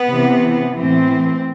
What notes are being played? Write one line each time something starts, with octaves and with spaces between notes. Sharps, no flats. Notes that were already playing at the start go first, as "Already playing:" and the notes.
Already playing: B3
C3 E3
A2 E3 C4